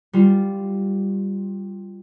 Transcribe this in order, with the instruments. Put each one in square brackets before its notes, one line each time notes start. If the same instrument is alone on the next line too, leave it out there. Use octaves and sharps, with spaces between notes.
[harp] G3 F4